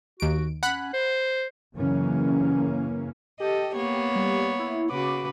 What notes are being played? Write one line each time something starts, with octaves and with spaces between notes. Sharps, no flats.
D#2 F#4 D7
C#4 F#5 B5 F#6
C5
F#2 C#3 E3 A#3 C#4
G4 A4 D#5
A#3 B3 C#5
G3
E4
C#3 F#4 B4 D6